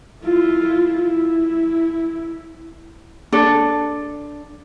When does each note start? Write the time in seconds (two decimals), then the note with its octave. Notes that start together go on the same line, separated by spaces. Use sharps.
0.23 E4 F4
1.01 E4
3.32 D4 A4